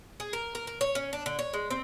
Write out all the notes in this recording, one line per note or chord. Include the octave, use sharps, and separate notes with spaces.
G#4
A#4
A#4
A#4
C#5
C#4
D4
D3
C#5
G#3
C4